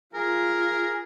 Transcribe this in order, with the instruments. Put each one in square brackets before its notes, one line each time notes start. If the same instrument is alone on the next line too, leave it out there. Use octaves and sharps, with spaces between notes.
[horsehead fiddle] F4 [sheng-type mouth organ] G#4 [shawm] A#4